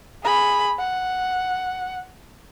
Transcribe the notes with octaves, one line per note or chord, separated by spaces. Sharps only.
G#4 B5
F#5